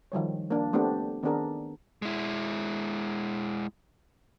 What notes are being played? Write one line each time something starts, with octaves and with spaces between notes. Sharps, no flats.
D#3 F3 G3 C#5
A#3 D4
A3 B3 C4 D4 G4
D#3 B3 C4 D4 G#4 A#4
G#3 E4